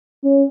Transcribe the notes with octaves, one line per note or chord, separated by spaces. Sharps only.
C#4